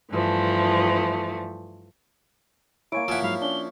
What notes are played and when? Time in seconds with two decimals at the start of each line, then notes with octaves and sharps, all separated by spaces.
0.11 G2 E3 F3 A3
2.92 A#3 E4 C#5 G#5 D7
3.08 F3 E4 F#5 G#5 E6
3.22 G#2 F#3 F5 B5
3.42 C#4 D4 G7